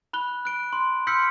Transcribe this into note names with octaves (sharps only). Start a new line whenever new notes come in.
B5 F#6 G7
F#6 D7
C6
C6 E6 F6 G6 B6 C#7